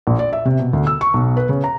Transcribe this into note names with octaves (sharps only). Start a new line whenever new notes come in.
A#1
D5
E5
C3
B2
D2
E6
C#6
B1
B4
C#3
A#5